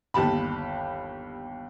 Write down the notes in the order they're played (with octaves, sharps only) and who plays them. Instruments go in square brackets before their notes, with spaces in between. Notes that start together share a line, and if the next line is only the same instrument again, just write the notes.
[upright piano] G1 D#2 G4 A5 B5